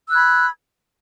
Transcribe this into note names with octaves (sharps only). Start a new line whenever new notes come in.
B5 E6 F#6 G#6